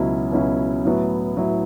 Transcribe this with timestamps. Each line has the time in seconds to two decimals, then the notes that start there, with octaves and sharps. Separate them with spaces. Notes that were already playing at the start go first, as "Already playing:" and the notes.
Already playing: C#2 B2 F#3 C#4 E4
0.32 C#2 B2 F#3 C#4 E4
0.85 A2 F#3 B3 E4
1.36 A2 F#3 B3 E4